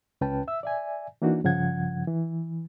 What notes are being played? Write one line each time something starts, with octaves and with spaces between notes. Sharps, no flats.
C#2 C#4 B4 G5 A5
E5 E6
D5 E5 G#5
E3 A#3 D4 D#4 F#4
G2 C#3 F3 F#5 G#6
E3